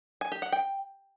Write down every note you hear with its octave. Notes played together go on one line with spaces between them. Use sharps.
G#5
G4
F#5
G5